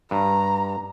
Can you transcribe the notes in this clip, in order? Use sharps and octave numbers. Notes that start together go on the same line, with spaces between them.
G2 A#5